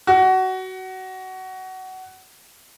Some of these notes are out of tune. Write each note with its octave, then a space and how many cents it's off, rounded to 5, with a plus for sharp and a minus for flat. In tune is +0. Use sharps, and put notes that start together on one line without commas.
F#4 +20